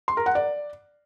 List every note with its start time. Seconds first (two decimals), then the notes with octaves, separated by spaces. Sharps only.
0.08 C6
0.17 A#4
0.26 F#5
0.35 D5